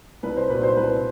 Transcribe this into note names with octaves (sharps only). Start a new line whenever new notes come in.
C2 B4
C5
A#2 F#3 B4
C5
C2 B4